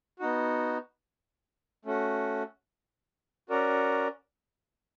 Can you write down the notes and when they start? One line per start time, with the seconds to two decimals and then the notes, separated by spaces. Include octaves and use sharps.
0.19 B3 D#4 F#4
1.85 A3 C#4 F#4
3.49 C#4 F#4 A#4 D5